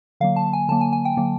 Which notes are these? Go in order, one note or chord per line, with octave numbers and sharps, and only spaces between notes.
D3 F#3 A#3 F5
A5
G#5
D3 F#3 A#3 A5
G#5
G#5
G5
D3 F#3 A#3